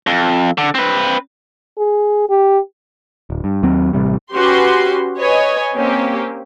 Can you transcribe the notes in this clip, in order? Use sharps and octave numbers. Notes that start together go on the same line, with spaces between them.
F2
D3
C4 B4
G#4
G4
D1
G2
D#2 F#3 C4
A1 C3 G3
C#4 F#4 G4 B4 C6
B4 C#5 D#5 G#5
A#3 C4 C#4 G4